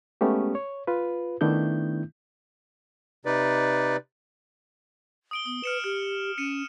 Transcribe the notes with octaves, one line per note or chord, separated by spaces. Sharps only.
G#3 A3 B3 C#4 G4
C#5
F4 B4
D#3 A3 B3 D4 E4 G6
C3 D#4 B4 D5
D#6 D7 G7
B3 D#6
B4 F6 C#7 E7
G4 F6
C#4 C#7 D#7 E7